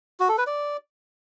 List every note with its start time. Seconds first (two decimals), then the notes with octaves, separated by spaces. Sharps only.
0.20 F#4
0.29 A4
0.38 B4
0.47 D5